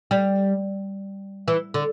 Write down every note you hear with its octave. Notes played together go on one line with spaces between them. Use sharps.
G3
E3
D3